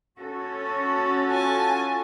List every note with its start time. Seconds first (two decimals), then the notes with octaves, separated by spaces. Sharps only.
0.19 C#4 F#4 A4
1.29 F4 G#5 A5